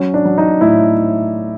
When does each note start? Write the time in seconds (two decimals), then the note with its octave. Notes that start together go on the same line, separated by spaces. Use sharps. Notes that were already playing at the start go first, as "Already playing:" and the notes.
Already playing: F#3 C#4
0.14 D4
0.25 F#3
0.38 D#4
0.61 A2 E4